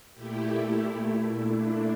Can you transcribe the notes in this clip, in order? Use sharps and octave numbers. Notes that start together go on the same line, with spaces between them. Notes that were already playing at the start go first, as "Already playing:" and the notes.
A#2 A3 E4 G4
E4 G4
A#2 A3 E4
D4